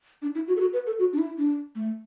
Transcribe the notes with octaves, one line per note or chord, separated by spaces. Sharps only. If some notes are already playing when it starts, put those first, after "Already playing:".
D4
E4
F#4
A4
F#4
B4
A4
F#4
D4
E4
D4
A3